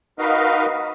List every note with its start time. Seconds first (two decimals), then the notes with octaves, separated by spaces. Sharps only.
0.19 D#4 F#4 A#4 B4 D#5 F5